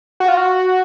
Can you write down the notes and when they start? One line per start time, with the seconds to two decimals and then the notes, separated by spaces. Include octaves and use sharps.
0.20 F#4
0.28 F4
0.37 F#4